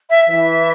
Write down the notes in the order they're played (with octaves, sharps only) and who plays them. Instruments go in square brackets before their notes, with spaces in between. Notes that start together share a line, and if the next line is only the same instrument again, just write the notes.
[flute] E5
[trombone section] E3 [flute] E5